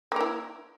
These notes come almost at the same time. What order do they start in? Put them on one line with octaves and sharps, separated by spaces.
A#3 A#4 E4